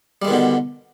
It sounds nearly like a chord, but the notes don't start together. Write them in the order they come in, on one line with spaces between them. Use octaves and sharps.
G3 G#3 D#3 B2 D3